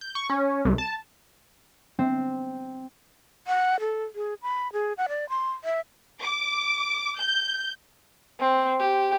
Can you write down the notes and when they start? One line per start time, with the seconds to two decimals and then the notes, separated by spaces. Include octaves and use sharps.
0.01 G6
0.15 C#6
0.30 C#4
0.65 C2
0.78 A5
1.99 C4
3.47 F#5
3.80 A4
4.15 G#4
4.42 B5
4.73 G#4
4.98 F#5
5.09 D5
5.29 C6
5.64 E5
6.20 D6
7.17 G6
8.40 C4
8.80 G4